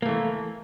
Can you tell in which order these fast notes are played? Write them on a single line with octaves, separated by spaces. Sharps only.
A#3 A3 E3